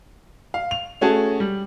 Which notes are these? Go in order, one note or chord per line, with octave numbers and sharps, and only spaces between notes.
F5
F7
A3 C#4 F#4 G#4 A5
G3